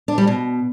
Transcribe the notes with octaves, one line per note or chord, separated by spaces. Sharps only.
D4
G3
B2